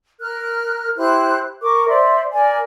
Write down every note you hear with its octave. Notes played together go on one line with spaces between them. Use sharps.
A#4 F6 F#6
E4 G4 C5 F#6
A#4 C#6 D6
C5 D5 E5 C6
A#4 D5 G#5